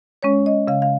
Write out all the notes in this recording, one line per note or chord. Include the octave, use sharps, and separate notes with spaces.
G#3 C#4 C#5
D#5
C#3 F5
F5